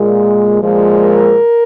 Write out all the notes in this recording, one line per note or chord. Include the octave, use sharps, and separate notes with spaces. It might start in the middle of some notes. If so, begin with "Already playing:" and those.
Already playing: A#2 G#3
A#2 F3 G#3
A#4